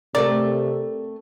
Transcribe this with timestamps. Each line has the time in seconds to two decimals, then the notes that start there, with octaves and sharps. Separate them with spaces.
0.15 C3 A3 C4 A#4 D5